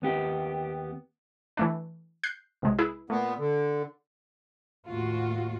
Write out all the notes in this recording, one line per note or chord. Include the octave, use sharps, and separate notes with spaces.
D#2 B3 G4
E3 A3 D4
F#6 G6 C7
B1 C3 G#3
E4 G#4 B4
A#2 A3 B3
D3
D#2 A2 F4 F#4